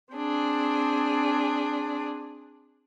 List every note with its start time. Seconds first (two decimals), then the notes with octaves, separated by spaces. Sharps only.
0.14 C4 D4 G#4